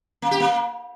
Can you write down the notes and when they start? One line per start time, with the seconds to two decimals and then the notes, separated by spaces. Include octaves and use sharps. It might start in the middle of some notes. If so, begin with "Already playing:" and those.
0.22 A#3
0.31 G4
0.40 A#3